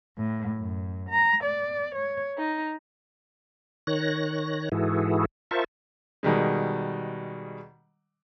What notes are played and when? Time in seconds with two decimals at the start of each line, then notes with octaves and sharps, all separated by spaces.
0.17 A2
0.57 F#2
1.09 A#5
1.44 D5
1.95 C#5
2.36 D#4
3.87 D#3 C#5 F#6 A#6
4.72 G#2 E3 E4 F#4 G#4 A4
5.51 F4 A#4 C5 E5 A5 C#6
6.23 B2 D#3 G3 G#3